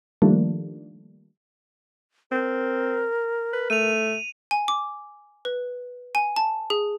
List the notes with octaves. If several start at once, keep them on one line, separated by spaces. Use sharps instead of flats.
D#3 F3 G3 A3 A#3 D4
C4 A#4
B4
A3 D#7 F7
G#5
D6
B4
G#5
A5
G#4